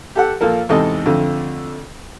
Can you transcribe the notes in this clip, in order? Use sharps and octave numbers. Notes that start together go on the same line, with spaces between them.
G4 A4 F#5
A#2 F3 A#3 A4 A#4
E2 G#2 C3 A4 D#5
F2 D3 A3